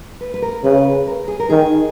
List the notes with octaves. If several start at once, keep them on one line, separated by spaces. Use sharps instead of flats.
B4
B4
A#4
C#3 B4
A#4
G#4
A#4
D#3 G#4